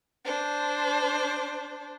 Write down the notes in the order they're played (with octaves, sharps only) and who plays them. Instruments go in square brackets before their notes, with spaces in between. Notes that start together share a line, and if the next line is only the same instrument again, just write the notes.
[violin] D4 C5